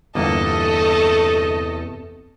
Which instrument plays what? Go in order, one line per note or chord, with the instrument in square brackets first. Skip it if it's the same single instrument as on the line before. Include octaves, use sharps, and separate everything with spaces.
[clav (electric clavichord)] G1 A#3 [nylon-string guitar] E2 C3 [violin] A3 A4 [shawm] D#5